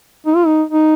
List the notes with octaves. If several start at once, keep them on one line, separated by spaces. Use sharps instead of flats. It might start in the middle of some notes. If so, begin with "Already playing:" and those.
D#4
F4
D#4
D#4